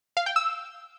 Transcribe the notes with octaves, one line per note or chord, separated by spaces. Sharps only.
F5
G5
E6